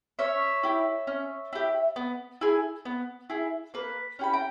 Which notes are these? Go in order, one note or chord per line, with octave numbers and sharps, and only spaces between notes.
C#4 C#5 E5
E4 G4
C#4
E4 G4
B3
E4 G#4
B3
E4 G#4
A#3 B4
C#4 E4 G4 B5
G5 A#5